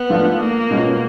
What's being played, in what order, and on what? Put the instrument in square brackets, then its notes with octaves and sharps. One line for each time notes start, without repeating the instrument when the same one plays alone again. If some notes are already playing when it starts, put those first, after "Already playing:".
Already playing: [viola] B3
[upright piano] G#2 F3 A3 D4 F4
[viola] A#3
[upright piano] B2 G#3 C#4 F4